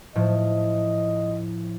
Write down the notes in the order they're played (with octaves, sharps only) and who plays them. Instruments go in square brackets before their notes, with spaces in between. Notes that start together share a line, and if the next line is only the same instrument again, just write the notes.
[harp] A2 F3 [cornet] D#5